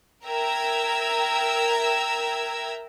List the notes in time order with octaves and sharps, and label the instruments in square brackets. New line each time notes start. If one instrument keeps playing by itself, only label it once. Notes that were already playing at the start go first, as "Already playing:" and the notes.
[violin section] A#4 E5 G5 A#5 E6 G#6